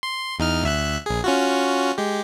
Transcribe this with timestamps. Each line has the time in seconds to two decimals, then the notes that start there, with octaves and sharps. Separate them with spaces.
0.03 C6
0.39 E2 D#4 F6
0.63 D2 E5 F#6
1.06 A#1 G#4
1.24 C#4 F4 F#4
1.98 G#3 G4